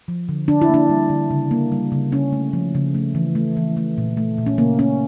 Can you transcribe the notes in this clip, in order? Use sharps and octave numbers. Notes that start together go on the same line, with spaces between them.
F3
D3
D3 D4
E4
A#3
D4
G3
D3
C#3
A#3
G3
C#3
C#3 C#4
A3
F3
C#3
A3
E3
A3
E3
A3
A#2
A3
A#2
C#4
C#3 A#3
A#3 C#4